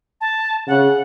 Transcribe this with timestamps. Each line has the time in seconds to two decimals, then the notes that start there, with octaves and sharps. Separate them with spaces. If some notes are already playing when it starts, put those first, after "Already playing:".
0.21 A5
0.68 C#3 F#5